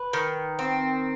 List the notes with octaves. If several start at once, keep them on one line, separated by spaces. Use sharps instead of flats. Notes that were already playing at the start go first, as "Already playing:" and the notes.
Already playing: B4
D#3
C4